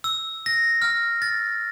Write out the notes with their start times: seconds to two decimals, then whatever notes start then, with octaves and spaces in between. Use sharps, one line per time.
0.04 E6
0.46 A#6
0.82 F6
1.22 A6